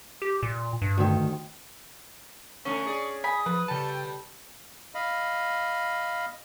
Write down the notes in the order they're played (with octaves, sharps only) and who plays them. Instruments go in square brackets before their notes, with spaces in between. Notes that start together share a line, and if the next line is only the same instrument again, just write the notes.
[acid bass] G4
A#2
G2
[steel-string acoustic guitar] D2 D#3
[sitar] D3 A3 [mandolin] C#4 [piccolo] C#6
[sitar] G#4 D5
[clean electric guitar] G#5 [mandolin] B5 [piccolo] D#6
[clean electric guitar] F3 [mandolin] B4
[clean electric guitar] C#3 A5 [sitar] G3 A4 [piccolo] G5
[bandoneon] D#5 F5 B5